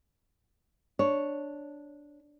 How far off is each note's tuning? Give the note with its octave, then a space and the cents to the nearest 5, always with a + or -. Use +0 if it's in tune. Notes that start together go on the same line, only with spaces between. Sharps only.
D4 +0 C#5 +0